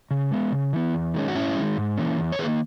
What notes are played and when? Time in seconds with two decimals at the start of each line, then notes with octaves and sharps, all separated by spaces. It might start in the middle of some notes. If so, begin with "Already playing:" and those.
0.11 C#3
0.31 G#3 B3
0.52 C#3
0.73 E3 B3
0.94 E2
1.14 D#3 G#3 C#4
1.28 F#4
1.35 G#2 C#4 E4
1.56 D#3 G#3
1.77 G#2
1.97 E3 A#3 C#4
2.19 E2
2.32 C#5
2.39 D#3 G#4 B4
2.43 A#3